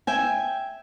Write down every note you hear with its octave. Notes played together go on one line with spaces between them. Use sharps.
E5 G5 G#5